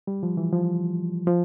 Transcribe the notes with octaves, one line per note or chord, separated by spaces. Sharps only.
G3
F3
E3
F3
F3